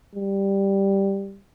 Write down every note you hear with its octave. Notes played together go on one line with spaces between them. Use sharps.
G3